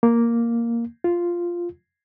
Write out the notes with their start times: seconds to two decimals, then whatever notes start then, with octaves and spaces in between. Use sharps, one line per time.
0.03 A#3
1.04 F4